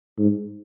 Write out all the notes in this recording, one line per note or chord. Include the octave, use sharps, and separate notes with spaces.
G#2